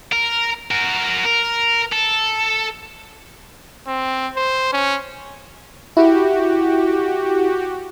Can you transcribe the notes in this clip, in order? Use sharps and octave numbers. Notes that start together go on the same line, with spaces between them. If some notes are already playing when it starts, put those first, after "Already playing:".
A#4
F#4 A#4
A#4
A4
C4
C5
C#4
E4 F#4 G4